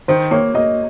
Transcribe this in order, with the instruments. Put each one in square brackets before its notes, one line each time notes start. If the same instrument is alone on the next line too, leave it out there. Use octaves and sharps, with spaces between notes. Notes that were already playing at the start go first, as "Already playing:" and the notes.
[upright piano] D#3 [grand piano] C5
[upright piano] A#3 [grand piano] C#5
[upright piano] A#3 [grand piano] D#5